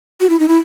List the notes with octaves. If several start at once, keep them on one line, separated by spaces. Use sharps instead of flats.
F#4
E4
D#4
E4